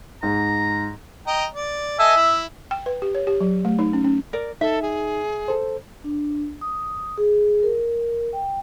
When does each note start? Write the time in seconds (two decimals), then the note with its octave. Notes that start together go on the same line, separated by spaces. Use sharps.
0.23 G#2 A#5
1.27 D#5 G5 A#5
1.54 D5
1.99 A4 D#5 E5 G#5
2.16 E4
2.71 G5
2.86 B4
3.02 G4
3.15 C#5
3.27 G4
3.41 F#3
3.65 A3
3.79 D#4
3.93 C#4
4.05 C#4
4.33 A#4 D5
4.61 D#4 A4 E5
4.82 G#4
5.48 A4 C5
6.04 D4
6.61 D#6
7.18 G#4
7.63 A#4
8.33 G5